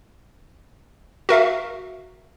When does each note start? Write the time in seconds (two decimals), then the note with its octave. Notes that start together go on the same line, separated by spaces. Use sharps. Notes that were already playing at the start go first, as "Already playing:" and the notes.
1.29 F#4 A#4 E5 F5